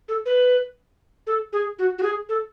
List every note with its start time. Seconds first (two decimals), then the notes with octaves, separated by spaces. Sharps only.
0.08 A4
0.26 B4
1.27 A4
1.53 G#4
1.79 F#4
1.98 F#4
2.03 G#4
2.29 A4